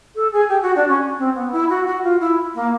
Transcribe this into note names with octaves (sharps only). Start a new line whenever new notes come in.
A4
G#4
G4
F#4
D4
C#4
C4
B3
E4
F#4
F#4
F4
E4
A#3